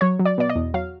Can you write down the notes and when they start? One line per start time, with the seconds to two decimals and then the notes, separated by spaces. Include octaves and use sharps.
0.01 F#3 C#5
0.19 F#3
0.25 D5
0.38 B2 D5
0.50 D#5
0.56 E2
0.74 F#3 F5